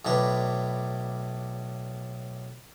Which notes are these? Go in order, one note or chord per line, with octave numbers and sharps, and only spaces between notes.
B1 A2 D4 B4